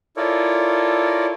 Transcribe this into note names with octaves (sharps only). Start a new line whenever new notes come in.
E4 F4 A4 A#4 C#5 D5